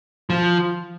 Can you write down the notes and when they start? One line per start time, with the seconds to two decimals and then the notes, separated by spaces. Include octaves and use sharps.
0.30 F3